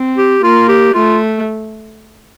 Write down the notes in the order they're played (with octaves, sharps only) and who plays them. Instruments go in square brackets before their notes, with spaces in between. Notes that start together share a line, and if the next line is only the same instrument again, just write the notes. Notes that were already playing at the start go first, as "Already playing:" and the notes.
Already playing: [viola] C4
[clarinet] G4
[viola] A#3 [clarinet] F4
[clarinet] G4
[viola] A3 [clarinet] F4